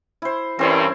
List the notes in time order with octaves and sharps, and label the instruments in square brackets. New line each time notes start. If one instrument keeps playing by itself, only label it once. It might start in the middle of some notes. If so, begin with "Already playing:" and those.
[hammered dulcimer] E4 C5
[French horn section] G2 [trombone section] E3 C#4 A#4 [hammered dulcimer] C4 E4 C6